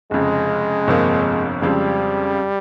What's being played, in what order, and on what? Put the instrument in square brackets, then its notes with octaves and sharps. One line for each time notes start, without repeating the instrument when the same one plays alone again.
[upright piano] F1 F2 C#3 [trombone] G#3
[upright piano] G1 F2 C3 F3 A#3
[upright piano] F2 C#3 F3 G#3 C4 [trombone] G3